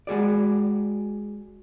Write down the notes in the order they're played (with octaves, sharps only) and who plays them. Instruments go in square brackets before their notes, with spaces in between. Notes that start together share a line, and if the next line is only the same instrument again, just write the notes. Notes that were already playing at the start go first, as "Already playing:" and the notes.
[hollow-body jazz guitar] G#3 F#4 G#4 D5